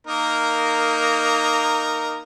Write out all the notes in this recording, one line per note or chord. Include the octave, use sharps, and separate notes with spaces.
A#3 D#4 A#4